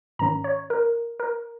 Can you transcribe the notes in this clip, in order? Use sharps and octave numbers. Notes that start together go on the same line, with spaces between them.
G#2 D#3 C#4 A#5
C#5
A#4
A#4